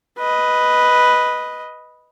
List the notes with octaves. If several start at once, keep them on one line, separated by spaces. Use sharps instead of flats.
B4 D#5